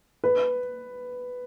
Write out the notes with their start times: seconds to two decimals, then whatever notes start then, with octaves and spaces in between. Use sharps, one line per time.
0.24 B4